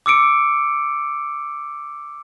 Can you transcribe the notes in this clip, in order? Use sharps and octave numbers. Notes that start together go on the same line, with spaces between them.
D6 E6 C#7 D7